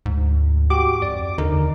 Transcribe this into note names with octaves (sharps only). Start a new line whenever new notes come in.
D2 G#2
F#4 G4 D6
F2 D5
D#2 D3 D#4 A#4